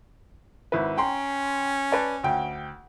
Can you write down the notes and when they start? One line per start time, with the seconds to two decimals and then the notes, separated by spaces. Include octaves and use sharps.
0.72 G#1 E4 B4
0.98 C#4 G5 A#5 C6
1.91 B4 D5 A5
2.24 D2 G5